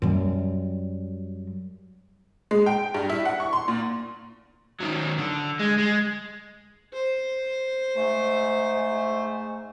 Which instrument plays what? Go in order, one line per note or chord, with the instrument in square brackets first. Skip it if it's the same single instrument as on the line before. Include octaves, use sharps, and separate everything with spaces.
[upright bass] F#2 G3
[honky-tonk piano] G#3
G5
G2
E4
F#5
C#6
C6
A#2
[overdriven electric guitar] D#3 F#3
D3
G#3
G#3
[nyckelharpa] C5
[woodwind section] G#2 A3